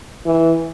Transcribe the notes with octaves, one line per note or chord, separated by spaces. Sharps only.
E3